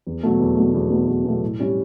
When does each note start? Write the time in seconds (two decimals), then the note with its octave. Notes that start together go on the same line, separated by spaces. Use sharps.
0.07 E2
0.23 B2 F#3 A3
0.40 E2
0.57 B2 F#3 A3
0.74 E2
0.91 B2 F#3 A3
1.07 E2
1.25 B2 F#3 A3
1.42 A2
1.59 G3 C#4 E4